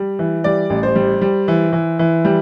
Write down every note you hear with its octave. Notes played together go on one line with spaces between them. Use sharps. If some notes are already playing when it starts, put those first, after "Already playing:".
Already playing: G3
E3
G3 D5
A1
C5
G3
G3
E3
E3
E3
G3